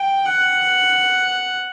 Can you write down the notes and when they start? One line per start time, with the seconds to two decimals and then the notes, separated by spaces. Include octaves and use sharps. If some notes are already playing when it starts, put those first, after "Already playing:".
Already playing: G5
0.25 F#5